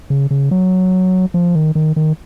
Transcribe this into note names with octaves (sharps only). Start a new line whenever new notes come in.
C#3
C#3
F#3
F3
D#3
D#3
D#3